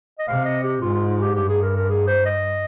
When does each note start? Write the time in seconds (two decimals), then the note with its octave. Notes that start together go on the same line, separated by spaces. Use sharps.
0.19 D#5
0.27 C3 F5
0.45 D#5
0.64 G4
0.81 G#2 F4
0.94 F4
1.09 F4
1.21 G4
1.35 G2 G4
1.49 G#4
1.62 A#4
1.76 A#4
1.89 G#4
2.07 C5
2.25 D#5